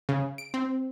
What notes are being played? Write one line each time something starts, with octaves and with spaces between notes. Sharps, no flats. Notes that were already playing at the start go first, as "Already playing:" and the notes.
C#3
D7
C4